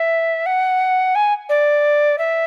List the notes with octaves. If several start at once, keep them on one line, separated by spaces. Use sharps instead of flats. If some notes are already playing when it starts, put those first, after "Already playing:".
Already playing: E5
F#5
G#5
D5
E5